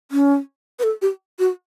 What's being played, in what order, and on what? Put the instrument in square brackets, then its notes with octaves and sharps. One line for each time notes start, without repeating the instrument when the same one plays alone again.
[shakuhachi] C#4
B4
A4
G4
F#4